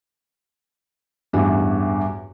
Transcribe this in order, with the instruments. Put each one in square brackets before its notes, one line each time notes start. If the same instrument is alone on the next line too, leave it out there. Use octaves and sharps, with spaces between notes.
[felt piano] A1 E2 G2 F#4